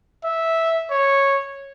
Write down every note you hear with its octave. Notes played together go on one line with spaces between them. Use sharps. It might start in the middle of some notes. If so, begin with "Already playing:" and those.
E5
C#5